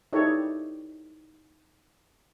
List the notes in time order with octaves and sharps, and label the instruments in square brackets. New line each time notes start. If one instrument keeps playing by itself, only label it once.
[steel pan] D#4 E4 G4 A4 C#5